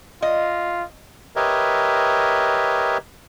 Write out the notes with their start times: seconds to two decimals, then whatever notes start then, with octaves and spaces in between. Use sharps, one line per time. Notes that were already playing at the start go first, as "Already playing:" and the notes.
0.22 F4 D#5
1.36 G4 A#4 B4 C#5 D#5 E5